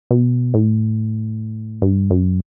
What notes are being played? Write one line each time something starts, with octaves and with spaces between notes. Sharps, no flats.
B2
A2
G2
F#2